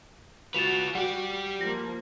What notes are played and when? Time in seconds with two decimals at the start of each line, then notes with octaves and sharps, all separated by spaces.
0.54 F4 F#4 B4 A6 E7 F7
0.95 G3 G4 F#5
1.61 F3 A#3 A#6